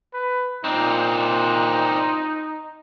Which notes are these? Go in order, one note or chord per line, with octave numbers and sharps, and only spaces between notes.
B4
A#2 C4 D4 D#4